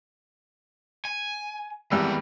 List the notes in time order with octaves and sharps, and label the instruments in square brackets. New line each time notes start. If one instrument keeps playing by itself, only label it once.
[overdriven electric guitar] G#5
[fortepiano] G#1 G3 E6 [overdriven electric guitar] E3 B3